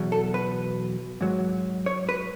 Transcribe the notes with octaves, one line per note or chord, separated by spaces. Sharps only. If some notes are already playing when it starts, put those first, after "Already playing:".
Already playing: E2 B2 F#3
A4
B4
G#2 F#3
C#5
B4